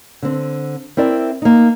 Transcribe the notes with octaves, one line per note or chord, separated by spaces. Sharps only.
D3 C4
C4 E4 A#4 D5
A#3 D#4